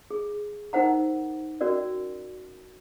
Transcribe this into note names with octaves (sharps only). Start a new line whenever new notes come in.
G#4
D#4 A#4 C5 F#5 A#5
C#4 F#4 A#4 D5